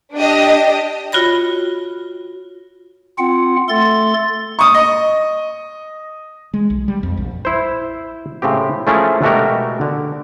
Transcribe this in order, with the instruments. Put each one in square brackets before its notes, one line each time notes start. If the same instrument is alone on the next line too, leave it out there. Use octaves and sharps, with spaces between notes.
[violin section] D4 G4 D#5
[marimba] F4 F#4 C#5 B5 A#6
[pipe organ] C4 F4 F#5
A3 A4 C6 A6
[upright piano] C#6 D#6
D#5
[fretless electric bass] G#3
B1
G3
F2
A#1
[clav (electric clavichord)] E4 C5
A2 C#3 C4 G4
F3 A3 C#4 E4 G#4 A#4
B2 G#3 A3 F#4 G4 A#4
D3